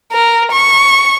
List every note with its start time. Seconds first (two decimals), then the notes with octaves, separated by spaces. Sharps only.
0.12 A#4
0.52 C#6